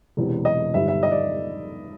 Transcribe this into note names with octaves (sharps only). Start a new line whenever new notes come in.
E1 E2 C3
D#5
G1 G2 D#3 G3 E5
E5
D#5
D5